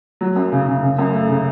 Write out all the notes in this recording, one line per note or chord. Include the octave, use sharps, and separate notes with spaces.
F#3
F#2
C#3
C#3
C#3
F#2
A3
C#3